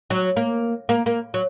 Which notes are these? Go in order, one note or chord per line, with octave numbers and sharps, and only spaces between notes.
F#3
A#3
A#3
A#3
F#3